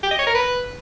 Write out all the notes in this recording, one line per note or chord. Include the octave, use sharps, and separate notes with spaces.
G4
D#5
C#5
A#4
B4